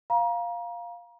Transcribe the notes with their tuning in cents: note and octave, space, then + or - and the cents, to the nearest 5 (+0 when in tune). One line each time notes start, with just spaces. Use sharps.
F5 +0 A#5 +30